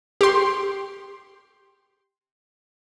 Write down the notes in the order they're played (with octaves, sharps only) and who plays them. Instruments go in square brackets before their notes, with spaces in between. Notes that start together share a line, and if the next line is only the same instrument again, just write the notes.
[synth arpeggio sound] G4 C6